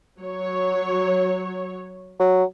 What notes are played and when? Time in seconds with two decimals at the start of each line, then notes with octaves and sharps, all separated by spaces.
0.19 F#3 C#5
2.19 F#3